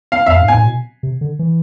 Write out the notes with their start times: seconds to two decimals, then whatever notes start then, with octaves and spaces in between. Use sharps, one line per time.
0.12 F5
0.26 F2 E5 F5
0.41 G#2
0.48 G#5
0.54 A2
0.66 B2
1.03 C3
1.21 D3
1.39 E3